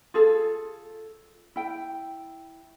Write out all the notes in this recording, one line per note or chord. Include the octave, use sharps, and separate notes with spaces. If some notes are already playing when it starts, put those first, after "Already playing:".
F4 G#4 A4
E4 G5